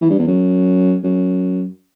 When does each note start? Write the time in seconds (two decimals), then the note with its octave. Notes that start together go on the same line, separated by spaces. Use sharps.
0.01 E3
0.10 G2
0.19 E2
0.27 F#2
1.04 F#2